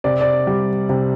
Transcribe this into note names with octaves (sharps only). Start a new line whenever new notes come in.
C3 D5
D5
G3
C3